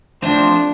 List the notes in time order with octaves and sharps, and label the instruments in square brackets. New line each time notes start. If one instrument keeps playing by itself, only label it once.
[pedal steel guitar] F3 A3 C4 F4 C5 [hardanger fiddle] D4